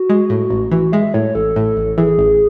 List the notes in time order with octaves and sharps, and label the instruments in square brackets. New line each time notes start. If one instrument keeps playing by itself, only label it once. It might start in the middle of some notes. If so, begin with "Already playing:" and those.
Already playing: [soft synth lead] F#4
[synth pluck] G#3
A2
A1
[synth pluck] E3 [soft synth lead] F#4
[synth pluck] G#3 [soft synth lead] E5
[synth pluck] A2 [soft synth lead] C#5
[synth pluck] A1 [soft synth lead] A4
[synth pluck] A2
A1
[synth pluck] E3 [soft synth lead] G#4
[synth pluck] A1